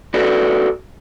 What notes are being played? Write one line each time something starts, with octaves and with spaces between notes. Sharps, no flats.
F#4 A4 B4 D5